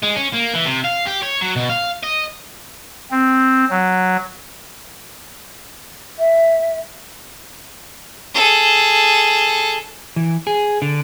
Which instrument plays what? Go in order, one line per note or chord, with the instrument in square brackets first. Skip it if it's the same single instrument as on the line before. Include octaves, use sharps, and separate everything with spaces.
[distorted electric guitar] G#3
C#4
A#3
E3
C3
F5
G4
C#5
F#3
B2
F5
D#5
[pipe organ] C4
F#3
[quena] E5
[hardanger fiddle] G#4 A4
[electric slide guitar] E3
G#4
D3